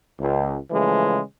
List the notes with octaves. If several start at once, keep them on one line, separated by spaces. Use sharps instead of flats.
C#2
C#3 E3 F3 G#3 A3